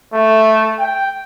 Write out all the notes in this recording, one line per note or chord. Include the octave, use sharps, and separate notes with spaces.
A3
G5